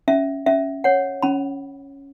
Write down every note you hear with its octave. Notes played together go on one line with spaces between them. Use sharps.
C#4 E5
C#4 E5
C#5 F#5
C#4 B5